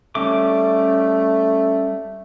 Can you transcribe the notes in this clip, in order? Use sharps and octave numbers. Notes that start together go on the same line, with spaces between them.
G3 A3 C#4 D6